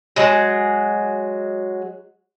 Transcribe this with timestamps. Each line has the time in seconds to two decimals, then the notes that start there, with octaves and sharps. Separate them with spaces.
0.16 F#3 G#3